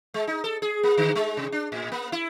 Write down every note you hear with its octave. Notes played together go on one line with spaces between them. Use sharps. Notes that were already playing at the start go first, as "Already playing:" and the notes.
G#3
D#4
A4
G#4
A#3
D3
G#3
C3
D4
A2
A#3
E4